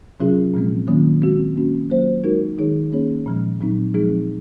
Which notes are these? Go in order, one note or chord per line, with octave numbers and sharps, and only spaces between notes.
C3 F#3 C#4 F4 G#4
A#2 F3 G#3 C4
D#3 F#3 A#3 C#4 F4
G#3 C4 F#4
A#3 C#4 F#4
F#3 A#3 F4 C5
G#3 D#4 F#4 A#4
D#3 G#3 D#4 G#4 C#5
A#3 C#4 G#4 C#5
A#2 F3 G#3
A#2 F#3 C4 D#4
F3 G#3 C4 D#4 G#4